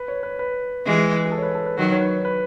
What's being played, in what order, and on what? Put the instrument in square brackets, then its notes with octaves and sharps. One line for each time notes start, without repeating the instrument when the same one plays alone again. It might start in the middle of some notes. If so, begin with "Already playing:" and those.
Already playing: [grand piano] B4
C#5
B4
B4
[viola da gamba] E3 G#3
[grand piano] G#4
A4
C#5
B4
A4
B4
[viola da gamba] D#3 F#3 [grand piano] B4
[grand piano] C#5
B4
B4